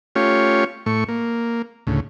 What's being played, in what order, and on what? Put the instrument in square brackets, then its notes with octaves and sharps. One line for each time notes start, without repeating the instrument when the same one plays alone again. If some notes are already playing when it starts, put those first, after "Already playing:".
[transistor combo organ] A3 C#4 F4 G4 C#5
A2 A3 C#6
A#3
D2 A2 C#3